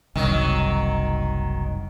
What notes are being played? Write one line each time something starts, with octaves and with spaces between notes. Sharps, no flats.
F#1 C2 D#3 F#3